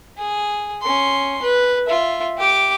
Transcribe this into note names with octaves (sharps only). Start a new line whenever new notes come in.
G#4
C#4 C6
B4
F4 E5
G4 D6